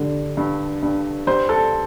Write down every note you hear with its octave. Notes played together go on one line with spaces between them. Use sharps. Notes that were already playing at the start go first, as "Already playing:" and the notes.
Already playing: D3 G3
G2
G2
G3 C5
A4